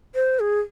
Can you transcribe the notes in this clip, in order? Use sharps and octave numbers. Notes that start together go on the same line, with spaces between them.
C5
G#4